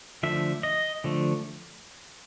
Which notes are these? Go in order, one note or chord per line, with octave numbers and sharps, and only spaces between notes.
D3 F3 A3 E5
D#5
D3 F3 A3